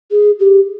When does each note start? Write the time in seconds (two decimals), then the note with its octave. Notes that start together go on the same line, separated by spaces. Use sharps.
0.11 G#4
0.40 G4